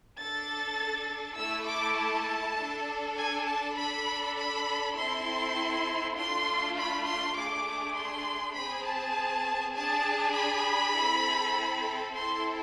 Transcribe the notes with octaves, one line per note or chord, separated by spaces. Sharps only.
D4 A4 A6
A3 E4 A4 E6
D6
A5
D4 A4
G#5
A5
D4 A4 B5
B5
C4 E4 A4 C6
A3 D4 F4 C6
B5
C6
A3 D4 G#4 D6
C6
C4 G#4 B5
A5
D4 G#4 A5
B5
C4 E4 A4
C4 E4 A4 C6